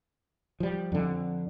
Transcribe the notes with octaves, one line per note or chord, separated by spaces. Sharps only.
F3 G3
F2 D3